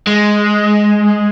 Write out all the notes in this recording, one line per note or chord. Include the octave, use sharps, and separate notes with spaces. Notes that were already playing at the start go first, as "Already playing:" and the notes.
G#3